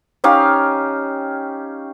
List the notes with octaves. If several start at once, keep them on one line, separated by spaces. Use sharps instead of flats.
C#4 D#4 G4 F5